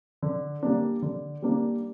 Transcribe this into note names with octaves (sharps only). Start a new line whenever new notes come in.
D3
G3 A#3 D4
D3
G3 A#3 D4